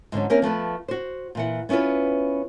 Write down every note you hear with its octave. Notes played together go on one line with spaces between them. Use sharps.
G#2 D3 F#3 C#4
A#3 C4 C#4 E4 A#4
F3 A3 B3 B4
F#4 C5
A#2 E3 F#5
B3 C#4 E4 F4 B4